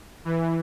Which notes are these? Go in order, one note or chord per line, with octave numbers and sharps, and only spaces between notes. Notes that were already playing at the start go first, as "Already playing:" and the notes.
E3